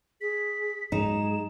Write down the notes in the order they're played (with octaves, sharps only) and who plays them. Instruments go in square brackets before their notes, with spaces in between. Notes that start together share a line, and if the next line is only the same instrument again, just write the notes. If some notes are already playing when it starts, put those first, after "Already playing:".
[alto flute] G#4 [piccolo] B6
[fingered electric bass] G#2 F#3 G#3 [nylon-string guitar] D#4 [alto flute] G#4 [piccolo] E7